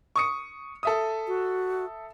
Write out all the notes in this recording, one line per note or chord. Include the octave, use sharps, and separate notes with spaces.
C#6 D#6 C#7
A4 E5 D#6
F#4